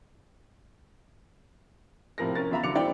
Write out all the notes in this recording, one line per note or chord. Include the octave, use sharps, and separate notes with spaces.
A2 C3 F3 A#4 A#6
C#4 A#4 A6
E2 F4 E5 A#5 B5
D3 F#3 D6 C#7 F7
E1 C4 E4 D5 G5